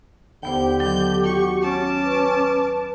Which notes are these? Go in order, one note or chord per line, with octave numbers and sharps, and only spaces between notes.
D#2 D3 B3 G4 C5 G6
D#3 F#3 G6
F#4 C#6
C#4 A5 D6
B4